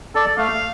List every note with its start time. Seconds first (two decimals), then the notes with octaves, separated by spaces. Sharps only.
0.15 A4 D5
0.38 A3 F5